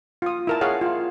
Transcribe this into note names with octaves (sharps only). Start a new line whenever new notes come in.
F4 D#6
E4 A#4 A5
G#4 C#5 F5 F#5
F4